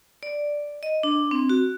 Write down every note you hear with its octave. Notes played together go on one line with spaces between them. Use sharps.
D5
D#5
D4
C4
F#4